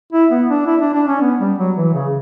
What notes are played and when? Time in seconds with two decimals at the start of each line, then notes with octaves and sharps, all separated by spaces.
0.13 E4
0.31 B3
0.49 D4
0.66 E4
0.81 D4
0.94 D4
1.08 C#4
1.21 B3
1.39 G3
1.58 F#3
1.77 E3
1.94 C#3